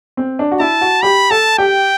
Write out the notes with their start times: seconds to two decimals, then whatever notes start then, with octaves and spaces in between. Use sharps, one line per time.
0.17 C4
0.39 D4
0.51 F#4
0.60 E4 A5
0.81 F#4
1.02 G4 B5
1.31 A4 A5
1.58 G4 G5